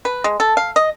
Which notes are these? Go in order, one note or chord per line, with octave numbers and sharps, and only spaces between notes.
B4
G#3
A4
F5
D#5